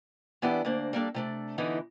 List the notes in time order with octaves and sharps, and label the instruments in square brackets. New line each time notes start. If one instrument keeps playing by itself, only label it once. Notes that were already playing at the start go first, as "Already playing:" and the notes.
[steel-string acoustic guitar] E3 B3 D4 E4 G4 D5
D2 A#3 D4 C5
G3 A#3 D4 A4
C3 A3 D4
D3 E3 B3 D#4 E4